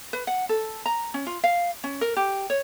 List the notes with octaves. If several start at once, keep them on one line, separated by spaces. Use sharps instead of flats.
B4
F#5
A4
A#5
C#4
F4
F5
C#4
A#4
G4
C#5